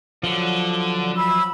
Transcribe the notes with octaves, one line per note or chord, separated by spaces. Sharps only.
D3 F3 F#3
B5 E6